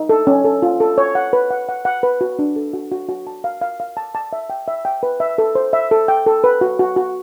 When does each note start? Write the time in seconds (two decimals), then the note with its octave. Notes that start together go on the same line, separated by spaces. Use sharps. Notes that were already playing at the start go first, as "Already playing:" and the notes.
Already playing: D#4
0.09 A4
0.27 C#4
0.45 A4
0.62 F4
0.80 A4
0.98 C#5
1.15 F#5
1.33 B4
1.51 F#5
1.69 F#5
1.85 F#5
2.03 B4
2.21 F#4
2.39 D4
2.56 A4
2.74 F#4
2.92 F#4
3.09 F#4
3.27 A5
3.44 F5
3.62 F5
3.80 F5
3.97 A5
4.15 A5
4.33 E5
4.50 G5
4.68 E5
4.85 G5
5.03 B4
5.20 E5
5.38 A4
5.55 C5
5.73 E5
5.91 A4
6.08 G5
6.26 A4
6.44 B4
6.61 F#4
6.79 F#4
6.96 F#4